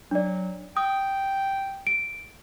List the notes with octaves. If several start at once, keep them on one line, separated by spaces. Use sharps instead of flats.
F#3 D4 D5
G5 D#6
D7